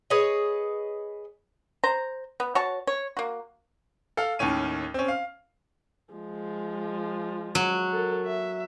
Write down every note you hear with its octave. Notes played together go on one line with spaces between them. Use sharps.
G#4 B4 C#5 D#5
C5 A#5
B3
F#4 C#5 A5
C#5
A#3 F#4
A4 F5 F6
D#2 A2 D#3 C#4 D#7
C4 C#4
F5
F3 G#3
F#3
A4 A#4
E5